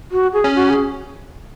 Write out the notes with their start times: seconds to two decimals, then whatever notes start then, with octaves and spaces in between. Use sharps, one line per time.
0.12 F#4
0.33 G#4
0.44 C#4
0.55 F#4
0.70 G#4